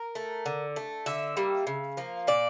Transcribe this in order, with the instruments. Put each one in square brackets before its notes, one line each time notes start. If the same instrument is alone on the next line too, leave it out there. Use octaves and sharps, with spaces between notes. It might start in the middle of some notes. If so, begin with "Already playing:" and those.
Already playing: [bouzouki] A#4
A3
D3
A3
D3 E5
G3 A#3
C#3
F3 A#3
A#2 D5